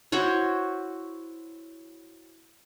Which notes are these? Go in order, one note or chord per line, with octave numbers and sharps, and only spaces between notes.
E4 F#4 C5 C#5